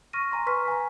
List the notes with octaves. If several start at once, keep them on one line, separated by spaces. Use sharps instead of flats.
C#6 F6 A#6 D#7
G#5 A#5 C6
B4 C#6 F6 B6
G#5 A#5